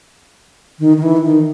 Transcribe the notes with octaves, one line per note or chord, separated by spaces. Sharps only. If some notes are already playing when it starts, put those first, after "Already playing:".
D#3
D#3
E3
D#3